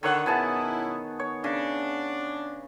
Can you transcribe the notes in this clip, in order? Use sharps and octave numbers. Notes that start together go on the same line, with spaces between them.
D3 D#3 C#5 F#5
B2 B3 C#4 E4 G#4 A5
C#5
C#3 D4